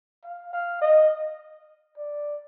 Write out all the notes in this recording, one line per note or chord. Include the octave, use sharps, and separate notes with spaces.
F5
F5
D#5
D5